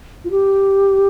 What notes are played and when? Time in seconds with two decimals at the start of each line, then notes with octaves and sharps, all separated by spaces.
0.24 F4
0.31 G4